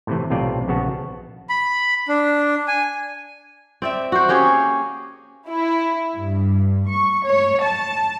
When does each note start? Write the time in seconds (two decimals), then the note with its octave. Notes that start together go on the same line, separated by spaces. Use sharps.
0.07 A2 C3 E3
0.30 B1 A2 C3 F4 D5 G5
0.68 A#1 C#3 B3 F#4 A5
1.49 B5
2.08 D4
2.68 G#5
3.82 C4 D5 E5
4.12 F#4 C5
4.29 A#3 C#4 G4 G#4
5.50 E4
6.16 G2
6.88 C#6
7.24 C#5
7.61 A5